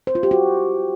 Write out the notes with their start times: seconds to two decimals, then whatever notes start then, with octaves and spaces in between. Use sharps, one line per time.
0.07 C5
0.15 F4
0.23 G4
0.31 F#4